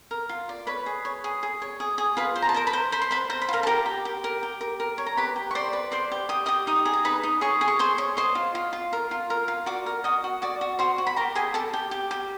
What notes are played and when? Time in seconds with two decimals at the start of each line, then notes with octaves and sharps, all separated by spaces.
0.11 A#4
0.29 F4
0.49 D5
0.67 B4 C#5 B5
0.86 G#4
1.05 C#5
1.24 G#4
1.43 G#4
1.62 C#5
1.80 G#4
1.98 G#4
2.17 F4 B4 B5
2.36 C5
2.42 A#5
2.49 A5
2.54 A#4 C5 A#5
2.67 B4 B5
2.73 C5
2.92 C5 B5
3.02 C6
3.11 B4 C5 B5
3.30 C5 A#5
3.42 B5
3.49 F4 A#4 A#5
3.63 A5
3.67 G4 A#4 A#5
3.86 G4
4.05 G4
4.24 A#4
4.43 G4
4.61 A#4
4.80 A#4
4.98 C#5
5.06 A#5
5.17 G4 B4 B5
5.36 G4
5.51 C#6
5.55 C5 D5 C6
5.73 B4
5.92 C5 D5 C6
6.11 G4
6.29 G4 D#6
6.46 G4 D#5 D#6
6.67 D#4 D#5 D#6
6.85 G#4
6.93 A#5
7.05 D#4 B4 B5
7.23 D#4
7.41 G#4 C#5 C#6
7.61 G#4
7.68 C#6
7.79 G#4 C5 C6
7.98 C#5
8.17 C5 D#5 C6
8.35 F4
8.55 F4
8.73 F4
8.93 A#4
9.11 F4
9.30 A#4
9.48 F4
9.66 F#4 D5 D6
9.86 A#4
10.04 F#4 D#5 D#6
10.24 F#4
10.42 F#4 D5 D6
10.61 F#4
10.79 F#4 C5 C6
10.98 F#4
11.07 B5
11.16 G4 A#4 A#5
11.35 G4 G#4 G#5
11.54 G4 A4 A5
11.73 G4
11.91 G4
12.11 G4